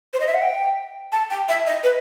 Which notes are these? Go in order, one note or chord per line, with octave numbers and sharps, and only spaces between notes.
C5
D#5
E5
F#5
G5
A5
G5
E5
D#5
B4